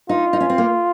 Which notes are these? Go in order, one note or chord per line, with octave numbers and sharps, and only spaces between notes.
D#4 F4
D#4
C#4
C4
A#3